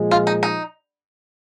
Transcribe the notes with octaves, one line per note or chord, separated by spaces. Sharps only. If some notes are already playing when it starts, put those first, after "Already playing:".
Already playing: A#2 F3 G#3
F4
D#4
D#4